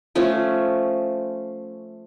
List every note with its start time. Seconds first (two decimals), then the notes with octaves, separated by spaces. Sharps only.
0.15 F3 A3 C#4